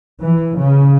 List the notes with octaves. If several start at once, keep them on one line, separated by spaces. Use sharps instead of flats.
E3
C#3